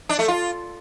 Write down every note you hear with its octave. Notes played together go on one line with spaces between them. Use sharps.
D4
A3
F4